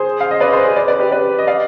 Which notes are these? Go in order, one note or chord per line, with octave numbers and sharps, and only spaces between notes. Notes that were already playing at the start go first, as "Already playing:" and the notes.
Already playing: G#4 C5
F5
D#5
B4 D5
G#4 C5
G#4 C5
B4 D5
B4 D5
G4 B4
B4 D5
D#5
D5 F5